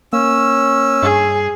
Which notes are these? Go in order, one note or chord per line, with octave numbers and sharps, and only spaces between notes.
A#3 C#4 E6
G2 G#4